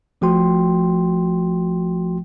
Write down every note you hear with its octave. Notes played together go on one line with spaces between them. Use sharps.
A#1 F3 A3 F#4 G5 C6